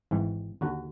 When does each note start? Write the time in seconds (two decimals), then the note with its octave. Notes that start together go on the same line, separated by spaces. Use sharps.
0.11 G#1 G#2 E3
0.61 D#2 D3 F#4